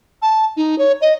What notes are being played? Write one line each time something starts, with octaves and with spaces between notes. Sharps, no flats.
A5
D#4
C#5
D#5